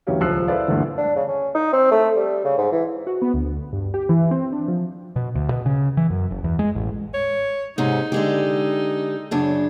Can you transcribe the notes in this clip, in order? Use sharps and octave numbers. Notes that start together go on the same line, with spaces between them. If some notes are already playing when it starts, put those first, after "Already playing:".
D2 E3 F#3 C#4 G4 F5
D#1 C#2 F3 E6 F#6 C7
E4 A4 B4 C5 D5 F5
D2 G2 A#2 D3 E3
D4
C#3
C#4
D#4
C4
A3
G3
C#3
G#2
E3
F#4
B3
D2
G2
G4
E3
C4
D4
F3
B2
D2
B2
C#3
E3
F#2
F#1
E2
G#3
A1
C#5
G#2 C3 C#4 D#4
D3 G#3 G4
F#2 C#3 D4